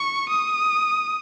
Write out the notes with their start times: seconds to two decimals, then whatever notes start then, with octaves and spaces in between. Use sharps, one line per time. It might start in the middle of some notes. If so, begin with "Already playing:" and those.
Already playing: C#6
0.29 D#6